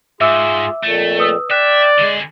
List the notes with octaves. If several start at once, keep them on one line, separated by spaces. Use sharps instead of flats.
G#2 F4 G#4 E5 D6 E6
F2 A#2 A3
B4 D#6 E6
D5 E5 G5 F#6
D3 G#3 G#4